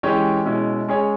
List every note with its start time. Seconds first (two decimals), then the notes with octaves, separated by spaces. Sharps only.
0.03 E3 G#3 C#4 G4 C#5
0.45 B2 G#3 C#4 E4
0.88 G#3 C#4 G#4 C#5